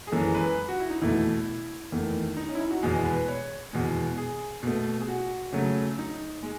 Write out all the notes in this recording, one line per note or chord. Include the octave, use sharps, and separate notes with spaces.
G#4
F#2 E3 G#3 A4
B4
F#4
E4
D#4
E2 B2 A3 E4
E2 D#3 A3
D#4
C#4
E4
D#4
F#4
E2 B2 G#3 G#4
B4
C#5
E2 B2 G#3
G#4
B2 A3
G#4
F#4
C#3 F#3 A3
D#4
G#3